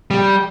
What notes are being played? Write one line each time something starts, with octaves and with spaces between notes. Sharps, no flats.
G3